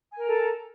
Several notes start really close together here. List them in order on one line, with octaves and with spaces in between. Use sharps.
G#5 A#4 A#5 A4